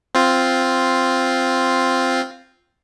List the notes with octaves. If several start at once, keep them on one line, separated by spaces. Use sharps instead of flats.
C4 F4